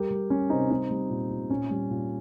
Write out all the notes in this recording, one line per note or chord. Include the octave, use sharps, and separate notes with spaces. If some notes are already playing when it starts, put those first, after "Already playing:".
Already playing: G3 G4 A#4
G3
G3 C#4
C3 C4 D#4
G3 C4 D#4
G3
A#2
A#2
A#2 C#4
G3
A#2